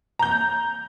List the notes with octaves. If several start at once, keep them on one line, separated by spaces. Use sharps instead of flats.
A#5 G6